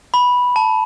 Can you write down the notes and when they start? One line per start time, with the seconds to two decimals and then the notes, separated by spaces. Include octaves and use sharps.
0.14 B5
0.56 A5